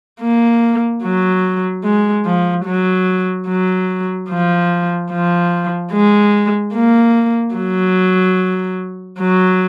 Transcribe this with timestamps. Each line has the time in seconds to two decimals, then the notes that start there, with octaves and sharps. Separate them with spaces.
0.21 A#3
1.03 F#3
1.84 G#3
2.25 F3
2.66 F#3
3.47 F#3
4.29 F3
5.11 F3
5.92 G#3
6.74 A#3
7.55 F#3
9.19 F#3